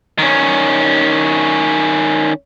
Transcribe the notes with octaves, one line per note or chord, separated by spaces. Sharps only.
D#3 C#4